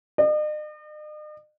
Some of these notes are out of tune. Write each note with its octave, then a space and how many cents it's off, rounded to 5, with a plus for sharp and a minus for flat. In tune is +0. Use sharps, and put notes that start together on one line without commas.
D#5 -45